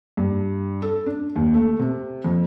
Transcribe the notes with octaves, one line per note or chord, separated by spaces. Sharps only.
G2
A4
D4
D#2
A3
C3
F2